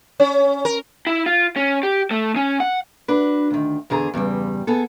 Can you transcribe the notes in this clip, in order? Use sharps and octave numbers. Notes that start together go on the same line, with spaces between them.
C#4
A#4
E4
F4
C#4
G4
A3
C#4
F#5
D4 F#4 B4
D2 D#3
E2 D3 G#4 A#5
E2 G2 C#3 G3
B3 G#4 A4